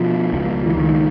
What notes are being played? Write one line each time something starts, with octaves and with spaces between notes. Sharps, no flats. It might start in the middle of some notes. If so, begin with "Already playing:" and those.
Already playing: B2 F3
C#2 F3
E3
C#2 D#3